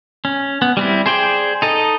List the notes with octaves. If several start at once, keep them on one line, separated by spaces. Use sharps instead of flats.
C#4
B3
G3 C4 E4
G#4 C5 D5 G5
D#4 A4 D#5